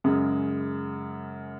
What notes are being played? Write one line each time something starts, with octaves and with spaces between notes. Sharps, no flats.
F#2 C#3 G#3